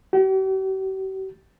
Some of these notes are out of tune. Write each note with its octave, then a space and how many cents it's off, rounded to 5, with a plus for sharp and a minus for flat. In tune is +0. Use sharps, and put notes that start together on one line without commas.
G4 -45